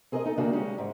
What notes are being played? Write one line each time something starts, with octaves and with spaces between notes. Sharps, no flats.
C4 G#4 A#4 C5 D#5
D#4 A4
D#2 C#3 A#3 D4 F#4
G3 G#3 C#4
G#2